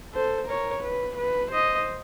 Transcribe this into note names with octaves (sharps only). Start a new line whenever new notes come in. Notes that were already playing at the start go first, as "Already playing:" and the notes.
A4 C5
A#4 C#5
B4
B4
C5 D#5